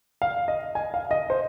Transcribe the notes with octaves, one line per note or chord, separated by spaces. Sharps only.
F5
D#5
G#5
F5
D#5
C5